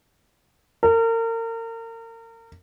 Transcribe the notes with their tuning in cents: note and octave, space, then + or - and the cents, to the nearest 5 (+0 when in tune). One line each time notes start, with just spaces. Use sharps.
A#4 -35